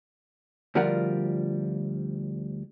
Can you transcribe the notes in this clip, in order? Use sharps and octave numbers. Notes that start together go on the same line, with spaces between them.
D2 F3 G3 F4 A#4 F#5